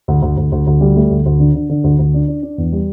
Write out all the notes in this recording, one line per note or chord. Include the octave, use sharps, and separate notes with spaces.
D2
D2
D2
D2
D2
G3
A3
D2
D2
D3
D3
D3
D2
D2
D4
D4
D4
E2
G3